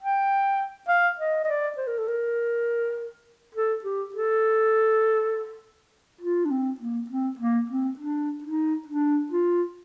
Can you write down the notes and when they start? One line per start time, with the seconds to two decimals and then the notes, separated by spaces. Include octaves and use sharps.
0.01 G5
0.88 F5
1.19 D#5
1.44 D#5
1.48 D5
1.78 C5
1.87 A#4
1.98 A4
2.08 A#4
3.55 A4
3.84 G4
4.14 A4
6.21 F4
6.45 D4
6.51 C4
6.80 A#3
7.10 C4
7.39 A#3
7.70 C4
7.99 D4
8.44 D#4
8.87 D4
9.32 F4